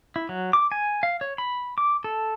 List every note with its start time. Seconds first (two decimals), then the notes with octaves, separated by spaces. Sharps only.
0.16 E4
0.29 F#3
0.53 D6
0.72 G#5
1.03 F5
1.21 C#5
1.38 B5
1.78 D6
2.04 A4